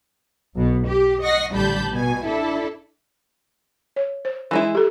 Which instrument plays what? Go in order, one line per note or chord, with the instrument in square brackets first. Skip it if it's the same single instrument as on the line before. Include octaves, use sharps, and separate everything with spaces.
[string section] B1 B2
G4
D#5 F#5 C#6 A#6 C7
A1 D3 G3 A5 B5 G6
B2 G3 G#5
D4 E4 A4
[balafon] C#5
C5
[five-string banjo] E3 G#3 E4
[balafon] G4 A4